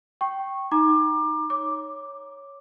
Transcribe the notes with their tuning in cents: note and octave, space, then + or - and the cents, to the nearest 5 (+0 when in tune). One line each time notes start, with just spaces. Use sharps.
G5 -15 C#6 -15
D#4 +0 A#5 +20 D6 +25
C#5 +0 D6 +0